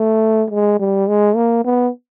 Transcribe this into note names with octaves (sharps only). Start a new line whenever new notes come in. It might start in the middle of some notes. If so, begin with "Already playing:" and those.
Already playing: A3
G#3
G3
G#3
A#3
B3